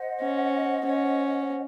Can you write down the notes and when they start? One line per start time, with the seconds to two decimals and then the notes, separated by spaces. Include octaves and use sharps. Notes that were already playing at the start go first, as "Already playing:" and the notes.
Already playing: C5 D#5 F#5
0.21 C#4
0.85 C#4